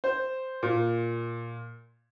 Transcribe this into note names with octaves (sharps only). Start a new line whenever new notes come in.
C5
A#2